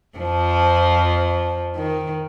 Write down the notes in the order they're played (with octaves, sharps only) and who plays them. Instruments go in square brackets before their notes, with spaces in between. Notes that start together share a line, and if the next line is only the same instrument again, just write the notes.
[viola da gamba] F2 F3
D#3